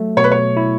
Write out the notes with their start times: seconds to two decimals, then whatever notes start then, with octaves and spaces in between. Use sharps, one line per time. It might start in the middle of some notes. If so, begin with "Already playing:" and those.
Already playing: F#3 A3
0.17 B2 C#5
0.24 B4
0.31 C#5
0.57 E4